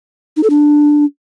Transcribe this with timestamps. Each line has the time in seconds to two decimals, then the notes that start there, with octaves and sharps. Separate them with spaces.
0.37 D#4
0.43 A4
0.50 D4